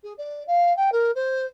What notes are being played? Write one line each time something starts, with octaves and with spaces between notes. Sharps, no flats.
G#4
D5
F5
G5
A#4
C5